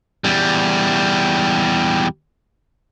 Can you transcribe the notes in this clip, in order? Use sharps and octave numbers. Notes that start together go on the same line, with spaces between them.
E2 G3